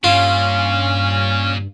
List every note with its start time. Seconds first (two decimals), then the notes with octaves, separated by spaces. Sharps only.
0.04 G2 A#2 C#4 F4